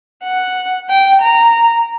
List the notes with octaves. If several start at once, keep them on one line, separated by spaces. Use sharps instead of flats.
F#5
G5
A#5